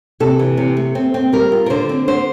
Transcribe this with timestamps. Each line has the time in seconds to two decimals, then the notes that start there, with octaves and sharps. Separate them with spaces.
0.20 C3 A4
0.39 E3
0.57 C3
0.77 A3
0.95 C4
1.14 C4
1.33 G3 A#4
1.52 F4
1.66 A#4
1.70 D3 C5
1.89 C4
2.08 D3 C5